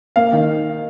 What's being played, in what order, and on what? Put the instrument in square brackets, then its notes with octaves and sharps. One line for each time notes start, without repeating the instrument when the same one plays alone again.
[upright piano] A#3 F5
D#3